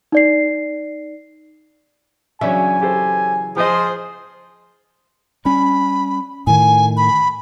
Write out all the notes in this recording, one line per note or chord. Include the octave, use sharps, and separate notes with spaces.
D#4 D5 C7
C#3 E3 F#3 C#4 D4 E5 G#5
G4 A4 C5
F3 F4 G#4 C5 D#5
G3 C#4 B5
A2 D#3 G#5
B5